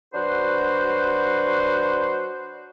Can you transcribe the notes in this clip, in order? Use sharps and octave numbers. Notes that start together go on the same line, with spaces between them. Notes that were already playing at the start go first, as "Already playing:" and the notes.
F#3 D4 F#4 B4 C5